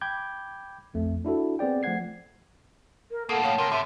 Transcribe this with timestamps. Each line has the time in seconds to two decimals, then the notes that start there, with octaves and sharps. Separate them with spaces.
0.01 G5 B5 D6 G6 G#6
0.94 A#1 F2 A3
1.25 D4 E4 F#4 A4
1.59 B3 C4 G#4 D5 G5
1.83 F3 A3 C5 F#5 G#6 C7
3.11 A#4
3.29 A2 A#3 A4 A#4 F#5 A5 D#6
3.44 C#5 F5 G5 D#6
3.58 C3 A#4
3.72 G#2 C3 E5